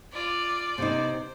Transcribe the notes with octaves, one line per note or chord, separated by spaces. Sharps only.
F4 D5
C3 B3 D#4 C5